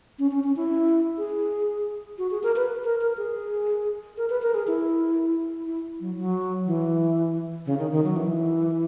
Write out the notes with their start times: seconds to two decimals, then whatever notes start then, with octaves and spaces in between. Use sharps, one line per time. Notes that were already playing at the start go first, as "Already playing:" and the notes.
0.19 C#4
0.31 C#4
0.44 C#4
0.56 E4
1.18 G#4
2.18 F#4
2.31 G#4
2.43 A#4
2.56 B4
2.84 A#4
3.01 A#4
3.17 G#4
4.17 A#4
4.30 B4
4.42 A#4
4.54 G#4
4.67 E4
5.66 E4
6.00 F#3
6.17 F#3
6.67 E3
7.66 C#3
7.78 D#3
7.92 D#3
8.04 F#3
8.16 E3